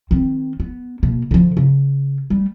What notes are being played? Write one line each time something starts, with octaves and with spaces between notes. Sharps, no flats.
D#3 C4
B3
B2 A#3
D3 F3
C#3
G3 A3